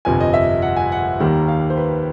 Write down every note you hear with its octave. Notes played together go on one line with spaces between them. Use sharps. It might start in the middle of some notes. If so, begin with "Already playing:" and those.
G1 F2 C3 G#5
D#5
E5
F#5
G#5
F#5
D#2 D#3 G3 A#3
F5
C5
B4